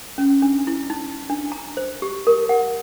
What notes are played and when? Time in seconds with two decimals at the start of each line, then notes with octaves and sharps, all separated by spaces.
0.18 C#4
0.42 D4
0.67 E4
0.90 D#4
1.30 D4
1.52 A#5
1.77 C5
2.02 G4
2.27 A#4
2.49 F#5